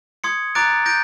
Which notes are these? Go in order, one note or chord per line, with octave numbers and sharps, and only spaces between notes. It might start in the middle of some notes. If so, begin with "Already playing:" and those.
C6 D#6 G#6 C#7
A#5 D6 F#6 A6 D7
G6 A#6 D7